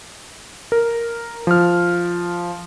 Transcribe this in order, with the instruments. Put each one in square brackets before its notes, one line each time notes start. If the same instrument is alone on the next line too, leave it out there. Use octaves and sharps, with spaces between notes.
[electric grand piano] A#4
F3 F6